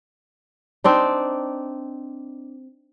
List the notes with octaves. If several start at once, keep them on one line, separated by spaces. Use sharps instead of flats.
C4 D4 D#4